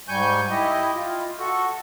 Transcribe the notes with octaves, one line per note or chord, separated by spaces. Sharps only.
G#2 G3 G#5 C#6 G6
E4 G4 D#5
F4
F#4 A4 C#6